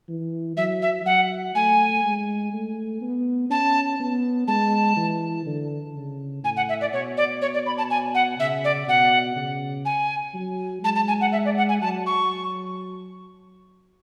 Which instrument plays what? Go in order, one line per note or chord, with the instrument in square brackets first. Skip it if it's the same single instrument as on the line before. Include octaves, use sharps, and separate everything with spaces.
[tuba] E3
[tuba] F#3 [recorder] E5
[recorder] E5
[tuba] F#3 [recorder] F#5
[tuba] A3 [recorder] G#5
[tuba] G#3
A3
B3
[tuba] C#4 [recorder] A5
[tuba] B3
[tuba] G#3 [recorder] A5
[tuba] E3
D3
C#3
[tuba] A2 [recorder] G#5
[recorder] F#5
E5
D5
[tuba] B2 [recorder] C#5
[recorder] D5
C#5
D5
B5
A5
G#5
F#5
[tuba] C#3 [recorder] E5
[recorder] D5
[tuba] B2 [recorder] F#5
[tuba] C#3
[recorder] G#5
[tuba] F#3
[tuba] G#3 [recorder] A5
[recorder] A5
G#5
F#5
E5
D5
F#5
G#5
[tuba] F#3 [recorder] A5
[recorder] C#6